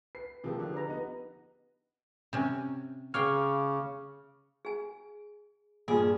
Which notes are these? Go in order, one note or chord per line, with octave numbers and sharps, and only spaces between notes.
B4 C7
C3 F3 A#3 G4 G#4
D3 F3
B4 A#5
B3 D#4
C3 C#4
C#3 C#5 F5 G5 C#6 D6 F6
G#4 G#5
G2 A#2 F4 G#4 G#5